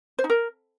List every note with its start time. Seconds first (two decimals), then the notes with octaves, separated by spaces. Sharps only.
0.19 C5
0.24 D#4
0.30 A#4